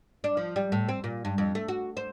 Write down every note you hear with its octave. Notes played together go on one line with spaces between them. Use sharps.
D4
F3
G3
A2
C4
A#2
G2
F2
A3
F#4
C5